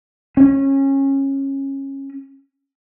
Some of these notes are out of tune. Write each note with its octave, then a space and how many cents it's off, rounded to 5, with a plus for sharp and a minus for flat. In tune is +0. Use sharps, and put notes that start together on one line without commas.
C#4 -20